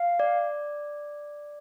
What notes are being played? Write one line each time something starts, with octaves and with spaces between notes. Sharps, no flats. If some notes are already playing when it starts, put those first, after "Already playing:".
Already playing: F5
D5